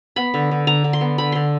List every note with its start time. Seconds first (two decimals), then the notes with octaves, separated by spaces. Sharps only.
0.16 B3 B5
0.34 D3
0.51 D3
0.67 D3 A#5
0.84 D3
0.93 C6
1.01 B3
1.18 D3 B5
1.32 D3 C6